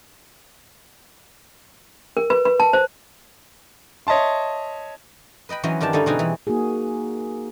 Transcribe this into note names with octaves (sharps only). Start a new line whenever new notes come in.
A#4
B4
B4
A5
C5
C#5 D#5 E5 A5 C6
B4 D#5 G5 B5
E3 F#3 C#4 C5 D#5
G2 D#3 D4 G4 A5
D3 G3 C#4 D#4 E4
B2 G3 C4 D#4 F#4 G#4
E3
A#3 D#4 F#4 G#4